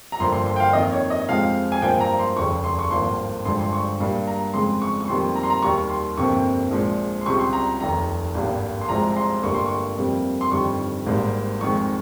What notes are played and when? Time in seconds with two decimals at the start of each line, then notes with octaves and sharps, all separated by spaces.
0.12 A#5
0.19 G1 G2 F3 A#3 C6
0.33 C6
0.46 C6
0.56 G5
0.60 F5
0.73 F2 D#3 A#3 D#5
0.92 C#5
1.10 D#5
1.28 F2 C3 F3 G#3 F5
1.72 G#5
1.82 G2 F3 A#3 G5
2.00 A#5
2.19 C6
2.36 F1 D#2 C#3 C#6
2.64 C6
2.79 C#6
2.91 G#1 G2 F3 A#3 C6
3.45 G1 G2 F3 G#3 C6
3.59 C6
3.73 C#6
4.00 G2 G3 A#3
4.27 A#5
4.54 F2 C#3 G#3 C6
4.82 C#6
5.00 C#6
5.08 F2 D#3 G3 A#3 C6
5.36 A#5
5.43 C6
5.50 A#5
5.63 D#2 D#3 G3 A#3 C#6
5.89 C6
6.17 G1 F2 C3 F3 A#3 C#6
6.71 A#1 A#2 F3 G#3
7.21 C6
7.26 C#2 C3 G3 C#6
7.39 C6
7.53 A#5
7.80 F1 D#2 D#3 A#5
8.34 G#1 G2 G3 A#3
8.81 C6
8.89 C2 C3 F3 G#3 A#5
9.12 A#5
9.16 C6
9.43 G1 G2 G3 A#3 C#6
9.54 C6
9.66 C#6
9.97 F2 C3 G3 A#3
10.41 C6
10.51 G1 F2 D#3 G3 C#6
11.06 G#1 G#2 G3 A#3
11.61 F2 D#3 G#3 C#6